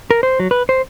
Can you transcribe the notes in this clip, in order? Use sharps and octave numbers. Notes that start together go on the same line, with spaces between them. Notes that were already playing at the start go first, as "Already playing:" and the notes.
A#4
C5
F#3
B4
C5